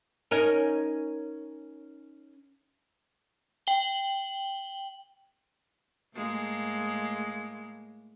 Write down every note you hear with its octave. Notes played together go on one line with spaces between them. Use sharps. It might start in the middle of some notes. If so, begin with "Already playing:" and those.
C#4 D#4 A#4
G5 F#7 G7
A2 G#3 A#3